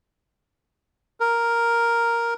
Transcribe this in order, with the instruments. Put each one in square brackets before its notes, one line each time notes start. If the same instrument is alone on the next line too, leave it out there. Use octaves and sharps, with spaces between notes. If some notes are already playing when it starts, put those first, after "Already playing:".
[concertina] A#4